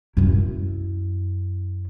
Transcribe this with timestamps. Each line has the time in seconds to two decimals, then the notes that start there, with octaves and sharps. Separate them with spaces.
0.17 F#2 E4